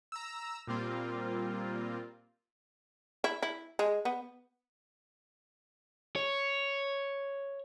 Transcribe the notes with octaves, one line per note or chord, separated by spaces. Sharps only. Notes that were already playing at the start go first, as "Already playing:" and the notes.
A#5 E6
A#2 G3 A#3 C4 F4
E4
E4
G#3
B3
C#5